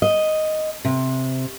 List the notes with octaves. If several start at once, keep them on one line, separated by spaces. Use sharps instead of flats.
D#5
C3